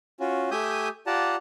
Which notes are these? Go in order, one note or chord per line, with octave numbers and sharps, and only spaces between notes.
C#4 F4 F#4
A3 G4 E5 G#5 D#6 G6
F4 G4 D5 F#5 A5 A#5